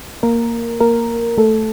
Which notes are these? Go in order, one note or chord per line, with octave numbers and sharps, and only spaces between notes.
A#3 A#4
A#3 A#4
A3 A4